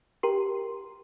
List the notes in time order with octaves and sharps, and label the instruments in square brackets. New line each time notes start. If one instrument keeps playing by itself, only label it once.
[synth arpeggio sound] G4 A#4 C6